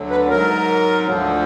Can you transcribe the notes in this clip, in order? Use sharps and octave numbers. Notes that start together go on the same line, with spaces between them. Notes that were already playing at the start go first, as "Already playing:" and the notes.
Already playing: D2 D3 F#3
B4
G#2 F#3 A#4
D2 D3 F3